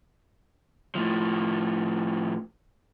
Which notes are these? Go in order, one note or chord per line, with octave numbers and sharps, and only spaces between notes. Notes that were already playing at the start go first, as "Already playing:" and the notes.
A2 F3